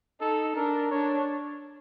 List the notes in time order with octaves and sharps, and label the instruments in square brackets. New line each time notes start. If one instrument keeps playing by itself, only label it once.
[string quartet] D#4 [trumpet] A4
[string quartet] D4 [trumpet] A#4
[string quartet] D4 [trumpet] C#5